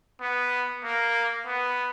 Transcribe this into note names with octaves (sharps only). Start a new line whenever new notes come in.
B3
A#3
B3